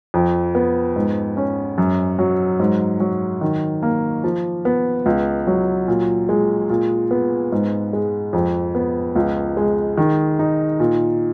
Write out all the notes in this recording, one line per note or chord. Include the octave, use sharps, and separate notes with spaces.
F2
B3
G#2
C#4
F#2
F#3
G#2
F#3
D#3
A#3
F3
B3
C#2
F#3
A#2
G#3
A#2
B3
G#2
G#3
F2
B3
C#2
G#3
D#3
D#4
A#2